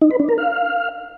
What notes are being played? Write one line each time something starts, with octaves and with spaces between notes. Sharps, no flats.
D#4
B4
D4
A#4
F5